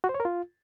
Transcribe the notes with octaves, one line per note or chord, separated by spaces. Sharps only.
F#4
C5
C#5
A#4
F4